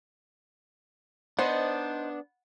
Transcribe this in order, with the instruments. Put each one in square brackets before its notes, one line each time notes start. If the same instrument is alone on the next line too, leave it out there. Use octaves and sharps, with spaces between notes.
[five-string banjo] B3 [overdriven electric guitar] D4 [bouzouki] D#4 C5 D#5